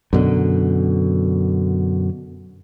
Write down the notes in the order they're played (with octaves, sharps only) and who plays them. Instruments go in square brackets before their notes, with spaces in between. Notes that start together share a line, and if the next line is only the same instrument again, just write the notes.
[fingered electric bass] F#2 B2 D3